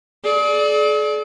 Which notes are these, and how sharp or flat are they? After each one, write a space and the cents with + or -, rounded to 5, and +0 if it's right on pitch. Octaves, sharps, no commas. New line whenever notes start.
G#4 +45 D5 +0